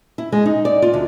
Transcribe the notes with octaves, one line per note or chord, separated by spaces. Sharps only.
E4
G#3
D#4
D5
F4
D2